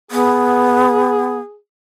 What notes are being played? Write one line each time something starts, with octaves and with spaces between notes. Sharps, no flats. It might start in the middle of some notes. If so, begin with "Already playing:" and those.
B3 G#4